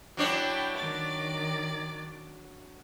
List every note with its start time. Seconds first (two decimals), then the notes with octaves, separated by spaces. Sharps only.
0.17 F#3 D4 E4 C#5 G5
0.76 D#3 D5 D6